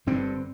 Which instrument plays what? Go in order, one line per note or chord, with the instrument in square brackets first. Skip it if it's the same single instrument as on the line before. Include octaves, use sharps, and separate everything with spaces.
[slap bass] G1 G2 D3 C4